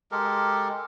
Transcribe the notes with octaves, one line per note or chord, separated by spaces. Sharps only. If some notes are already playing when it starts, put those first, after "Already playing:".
G#3 G4 A4 A#4